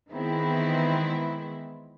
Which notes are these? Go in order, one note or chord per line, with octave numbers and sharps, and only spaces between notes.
D#3 E3 G#3 B3 C4 E4